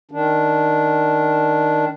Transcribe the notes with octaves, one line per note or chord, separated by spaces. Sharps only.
D#3 D4